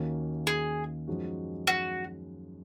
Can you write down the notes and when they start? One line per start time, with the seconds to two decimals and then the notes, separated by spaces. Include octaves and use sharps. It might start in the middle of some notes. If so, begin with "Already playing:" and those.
Already playing: D#2 D#3 A#3 C#4 F#4
0.47 G#4
1.08 F#2 F3 G#3 D#4 F#4
1.67 F#4